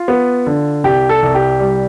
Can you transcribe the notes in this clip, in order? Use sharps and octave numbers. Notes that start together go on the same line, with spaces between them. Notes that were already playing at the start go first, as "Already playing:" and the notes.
Already playing: F4
B3
D3
C2 G4
A4
C2
G4
G3